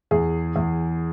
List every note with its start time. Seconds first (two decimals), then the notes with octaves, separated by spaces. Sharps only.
0.11 E2 G#4
0.56 E2